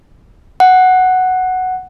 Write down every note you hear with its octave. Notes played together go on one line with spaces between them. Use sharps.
F#5